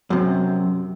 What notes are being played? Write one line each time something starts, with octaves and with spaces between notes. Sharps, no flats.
F#2 C3